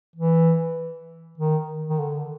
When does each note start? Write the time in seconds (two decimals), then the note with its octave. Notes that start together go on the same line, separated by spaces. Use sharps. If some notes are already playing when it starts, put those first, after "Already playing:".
0.16 E3
1.38 D#3
1.89 D#3
1.99 D3